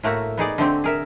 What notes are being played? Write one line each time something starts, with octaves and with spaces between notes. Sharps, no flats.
A2 A3 A#3 F#4 E5
B3 D#4 G#4 D5
D3 A3 C4 G4
G#4 A#4 E5